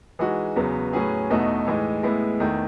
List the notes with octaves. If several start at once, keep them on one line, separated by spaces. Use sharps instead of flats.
E3 G#3 D#4 F#4
E2 C#3 F#3 B3
A2 F#3 C#4 G#4 B4
E2 B2 A3 D#4 F#4
A2 E3 G#3 D#4
A2 G#3 B3 E4
E2 D#3 A3